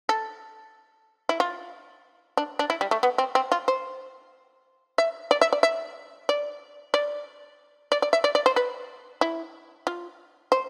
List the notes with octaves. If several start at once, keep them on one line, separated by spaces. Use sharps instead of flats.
A4
E4
F4
D4
D4
E4
G3
A3
B3
C4
C4
F4
C5
E5
D5
E5
D5
E5
D5
D5
D5
D5
E5
D5
D5
C5
B4
E4
F4
C5